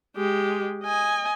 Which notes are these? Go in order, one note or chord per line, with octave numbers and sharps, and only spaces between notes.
G#3 G4
D#5 G#5